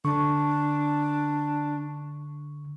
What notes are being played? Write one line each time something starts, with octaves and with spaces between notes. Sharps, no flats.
D3 D4 C#6